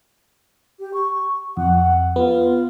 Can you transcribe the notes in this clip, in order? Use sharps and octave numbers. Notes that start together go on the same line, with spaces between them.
G4
C#6
F2 F#5
B3 F4